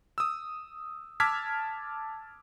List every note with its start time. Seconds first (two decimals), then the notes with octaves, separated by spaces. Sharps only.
0.18 D#6 E6
1.20 A5 D6 E6 F6 G#6 B6